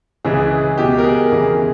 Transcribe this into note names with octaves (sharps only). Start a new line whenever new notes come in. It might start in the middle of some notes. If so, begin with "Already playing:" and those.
C#2 C#3 E3 G#4
C#2 B2 G4
A#4
G#4
E2 C#3 E3